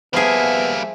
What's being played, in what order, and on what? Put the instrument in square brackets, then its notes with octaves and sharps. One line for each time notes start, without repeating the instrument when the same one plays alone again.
[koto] F3 G#4 [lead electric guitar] G3 A#3 [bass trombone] B3 [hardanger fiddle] E5